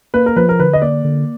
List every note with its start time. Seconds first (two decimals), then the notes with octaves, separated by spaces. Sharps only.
0.14 A#3 B4
0.26 A#4
0.36 F3 B4
0.49 A#4
0.60 D3 B4
0.73 D#5
0.82 A#3 D5
1.04 D3